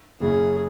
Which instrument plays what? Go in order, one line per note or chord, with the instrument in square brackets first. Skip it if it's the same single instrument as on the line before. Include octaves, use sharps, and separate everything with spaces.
[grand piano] F#1 F#2 C#3 F#3 C#4 [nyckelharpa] G#4